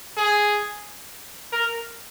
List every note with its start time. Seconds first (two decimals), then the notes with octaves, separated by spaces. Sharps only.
0.17 G#4
1.52 A#4